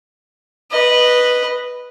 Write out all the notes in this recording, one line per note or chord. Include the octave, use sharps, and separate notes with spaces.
B4 D#5